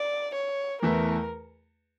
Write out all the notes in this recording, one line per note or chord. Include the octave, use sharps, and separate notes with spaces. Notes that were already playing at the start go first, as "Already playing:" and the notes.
Already playing: D5
C#5
E2 E3 A3 E4 A#4